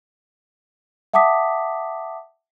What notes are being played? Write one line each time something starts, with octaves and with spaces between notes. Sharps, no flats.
E5 F#5 A5 D6 D#6 B6